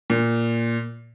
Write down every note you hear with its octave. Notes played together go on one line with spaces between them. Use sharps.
A#2